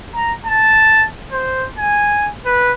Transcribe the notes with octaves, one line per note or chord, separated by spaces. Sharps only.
A#5
A5
C5
G#5
B4